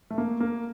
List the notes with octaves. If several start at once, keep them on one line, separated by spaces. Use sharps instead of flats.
A3
A#3
A#3